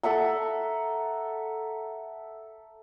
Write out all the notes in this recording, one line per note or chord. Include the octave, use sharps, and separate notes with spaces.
A4 E5 F#5 A#5